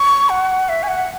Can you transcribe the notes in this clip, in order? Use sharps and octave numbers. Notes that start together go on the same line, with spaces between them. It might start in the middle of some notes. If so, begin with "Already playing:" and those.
Already playing: C#6
F#5
E5
G#5
F#5